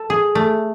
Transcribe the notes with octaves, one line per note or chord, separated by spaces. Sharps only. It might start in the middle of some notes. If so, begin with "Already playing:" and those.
Already playing: A4
G#4
A3